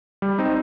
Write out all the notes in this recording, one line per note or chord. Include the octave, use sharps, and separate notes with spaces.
G3
C4 D#4